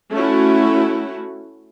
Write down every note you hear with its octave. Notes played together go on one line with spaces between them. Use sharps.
A3 C#4 E4 F#4